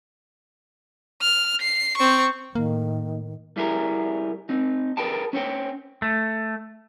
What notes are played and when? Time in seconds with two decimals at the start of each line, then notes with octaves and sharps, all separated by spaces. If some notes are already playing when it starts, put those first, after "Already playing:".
1.21 F6
1.61 C7
1.97 C4 C#6
2.55 A2 D#3 A#3
3.57 G3 E4 G#4 A#4
4.49 C4 D#4
4.97 G#4 A#4 B4 G5 A5
5.33 C#4 C5 C#5 G5
6.02 A3